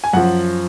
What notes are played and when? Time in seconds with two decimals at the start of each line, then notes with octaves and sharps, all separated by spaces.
0.04 G#5
0.13 F#2 F3 F#5